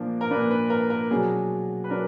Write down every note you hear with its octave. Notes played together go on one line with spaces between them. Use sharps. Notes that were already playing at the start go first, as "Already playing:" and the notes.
Already playing: A#2 F3 A#3 D4
A#4
A#2 F3 A#3 D4 B4
B4
A#4
A#4
B2 F#3 D4 G#4
B4
F#3 D4 A#4